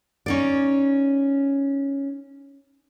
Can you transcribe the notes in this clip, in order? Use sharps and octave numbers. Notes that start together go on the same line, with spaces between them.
C#4 D#4 D5